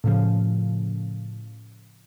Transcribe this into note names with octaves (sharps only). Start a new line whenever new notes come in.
A2 C#3 F3